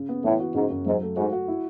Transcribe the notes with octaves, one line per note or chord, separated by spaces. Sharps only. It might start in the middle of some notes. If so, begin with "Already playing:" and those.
Already playing: C#3
B3
A2 E3
F#4
G#2 C#3
F#2
G#2 F#3
A3
G#2 F#4
F#4
E4